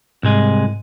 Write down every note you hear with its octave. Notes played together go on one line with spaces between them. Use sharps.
C2 G#2 G#3 D#7